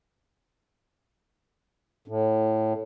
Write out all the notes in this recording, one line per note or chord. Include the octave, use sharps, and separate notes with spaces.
A2